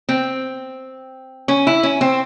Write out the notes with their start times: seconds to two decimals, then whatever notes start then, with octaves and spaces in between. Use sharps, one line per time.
0.09 C4
1.48 C#4
1.67 E4
1.83 C#4
2.01 C4